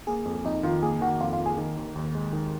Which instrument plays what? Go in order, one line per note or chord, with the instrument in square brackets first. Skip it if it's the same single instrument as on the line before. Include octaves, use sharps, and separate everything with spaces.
[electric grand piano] A#3 [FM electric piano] G#4
[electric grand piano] F2
[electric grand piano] F2 [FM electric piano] D#4
[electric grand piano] D#3 [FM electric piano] F4
[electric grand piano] A#3 [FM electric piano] G#4
[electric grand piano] D#3 [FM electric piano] F#4
[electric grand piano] F2 [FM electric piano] F4
[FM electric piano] F4
[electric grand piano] A#3
[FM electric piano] G#4
[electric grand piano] D#3
D#2
D#2
G#3
D#3